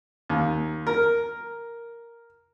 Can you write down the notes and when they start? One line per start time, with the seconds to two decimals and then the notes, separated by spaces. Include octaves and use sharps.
0.30 D#2
0.87 A#4